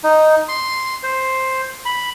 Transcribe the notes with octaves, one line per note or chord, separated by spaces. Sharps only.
D#4
C6
C5
B5